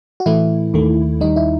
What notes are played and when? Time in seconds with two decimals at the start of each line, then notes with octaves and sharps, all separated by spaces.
0.20 F#4
0.26 A2 E3 A3 E4
0.74 D#2 D#3 A3
1.21 D#2 D#3 G3 D#4
1.36 E4